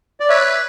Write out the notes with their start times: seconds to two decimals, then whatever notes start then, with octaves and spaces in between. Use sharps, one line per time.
0.20 D5
0.29 B4 C#5 E5